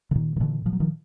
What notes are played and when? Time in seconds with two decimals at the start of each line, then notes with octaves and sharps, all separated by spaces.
0.11 D3
0.15 A#2 D#3
0.36 D#3
0.40 A#2 D3 E3
0.65 A#2 F3
0.73 F#3
0.80 D#3 F3